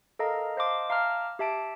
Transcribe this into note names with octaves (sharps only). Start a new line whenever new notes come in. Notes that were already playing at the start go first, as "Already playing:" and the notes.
A4 A#4 D#5 F5 A#5
C5 D#5 F5 A5 C6 D6
E5 F5 A5 A#5 D6 F6
G4 E5 A5 D7